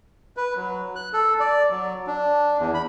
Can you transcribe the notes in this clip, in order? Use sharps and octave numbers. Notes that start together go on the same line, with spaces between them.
B4
F#3
F#6
A4
D5
F#3
D4
E2
B5